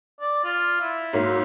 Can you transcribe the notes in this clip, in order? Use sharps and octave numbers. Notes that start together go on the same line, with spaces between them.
D5
F4
E4
G#2 F#3 A#3